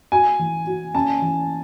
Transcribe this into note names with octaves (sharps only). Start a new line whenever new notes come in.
F#4 G#5
E3
F#4
C#4 A5
E3